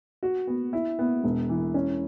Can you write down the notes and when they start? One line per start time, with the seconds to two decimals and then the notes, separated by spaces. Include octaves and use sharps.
0.23 F#4
0.47 B3
0.73 E4
0.99 B3
1.24 E1
1.49 E3
1.74 C#4